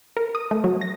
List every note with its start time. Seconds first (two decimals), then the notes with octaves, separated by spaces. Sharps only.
0.17 A#4
0.35 D#6
0.51 A3
0.64 F#3
0.81 A#6